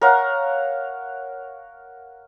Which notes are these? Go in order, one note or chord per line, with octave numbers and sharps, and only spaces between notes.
A#4 C#5 F5 F#5